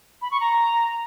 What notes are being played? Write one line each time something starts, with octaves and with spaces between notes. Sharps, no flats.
B5
C#6
A#5